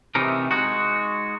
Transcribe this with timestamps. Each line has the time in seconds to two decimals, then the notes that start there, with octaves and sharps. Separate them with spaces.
0.15 C3 E3 A3 D#4 A#4
0.51 G#3 D#4 F#4